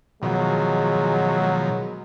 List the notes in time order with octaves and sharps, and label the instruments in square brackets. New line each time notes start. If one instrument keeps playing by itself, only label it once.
[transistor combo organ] B2 D#3 F3 [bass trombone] F#3 [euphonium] G#3
[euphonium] G#3